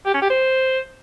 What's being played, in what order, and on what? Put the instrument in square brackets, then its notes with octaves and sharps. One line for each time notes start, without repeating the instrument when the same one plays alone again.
[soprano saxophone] G4
C#4
G4
C5